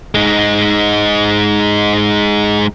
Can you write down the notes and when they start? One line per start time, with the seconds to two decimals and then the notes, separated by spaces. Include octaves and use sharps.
0.15 G#3 D#4